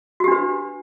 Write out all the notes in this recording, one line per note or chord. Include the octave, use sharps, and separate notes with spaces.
D4 F#4 G4 B4